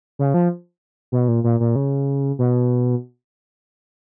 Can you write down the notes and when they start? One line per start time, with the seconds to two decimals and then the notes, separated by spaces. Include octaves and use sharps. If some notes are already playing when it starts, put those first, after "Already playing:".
0.19 C#3
0.34 F3
1.12 B2
1.28 A#2
1.44 A#2
1.60 A#2
1.76 C#3
2.39 B2